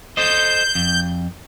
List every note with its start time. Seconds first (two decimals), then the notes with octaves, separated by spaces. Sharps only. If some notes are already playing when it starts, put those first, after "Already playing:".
0.17 A4 C5 D#5 G6
0.75 F2